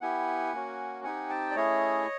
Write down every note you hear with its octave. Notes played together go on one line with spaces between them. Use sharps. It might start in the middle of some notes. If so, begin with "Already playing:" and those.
B3 E4 G4 F#5 G#5
A#3 C#4 F#4
C4 D#4 G4 F#5 G#5
G5 A5
D5
A3 C#4 E4 G#4 C#5 D#5